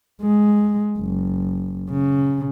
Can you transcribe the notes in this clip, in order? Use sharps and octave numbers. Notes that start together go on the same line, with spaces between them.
G#3
F#1
C#3